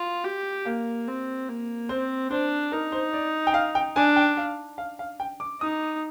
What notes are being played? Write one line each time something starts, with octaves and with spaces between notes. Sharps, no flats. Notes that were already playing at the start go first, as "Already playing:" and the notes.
Already playing: F4
G4
A#3 F5
C4
A#3
C4 C5
D4 C5
D#4 A#4
C5
D5
G5
F5
G5
D4 G#5
G5
F5
F5
F5
G5
D6
D#4 D#6